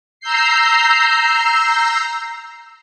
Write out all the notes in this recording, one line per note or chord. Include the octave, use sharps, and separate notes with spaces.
A#5 E6 G6 C7